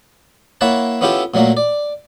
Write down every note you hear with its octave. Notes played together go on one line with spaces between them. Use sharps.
A#3 E4 C#5 E5 F#5 A5
B3 C#4 E4 F4 G4 A4
A#2 F#3 A3 A#3
D5